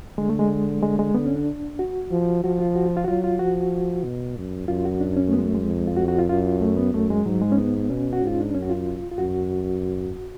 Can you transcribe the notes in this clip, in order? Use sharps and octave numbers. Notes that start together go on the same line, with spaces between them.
D3 G#3
A3
G#3
G#3
G#3
D3 B3
C#4
D4
F#4
F3
F3 F#4
F4
F#4
F4
F4
F#4
F#3 F4
F4
F3 F#4
B2
F#2
F#2 F4
F#4
D4
C#4
A3
B3
G#3
A3
G#3
F2
F4
F#4
F#4
F4
F#2 F4
A3
B3
F#2 A3
G#3
G#2 F#3
G#3
C#4
B3
B2 C#4
F#4
G#2
F4
D4
F#2 C#4
F#4
F4
F4
F#2 F#4